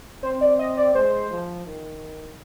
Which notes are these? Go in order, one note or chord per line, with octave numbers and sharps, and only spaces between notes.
C4 C5
D5
D#5
D5
G#3 C5
F3
D#3